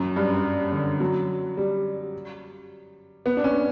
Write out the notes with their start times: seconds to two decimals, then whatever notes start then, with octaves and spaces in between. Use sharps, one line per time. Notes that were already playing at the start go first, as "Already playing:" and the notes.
Already playing: F#2
0.16 G2
0.72 D3
1.00 F#3
1.57 G3
3.26 B3
3.37 D4
3.44 C#4